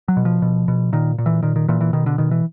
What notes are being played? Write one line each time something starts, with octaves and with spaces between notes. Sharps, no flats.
F#3
B2
F3
B2
B2
A#2 D#3
A#2
E3
A#2 D#3
D#3
A#2 E3
E3
B2 D#3
D3
B2 D#3
E3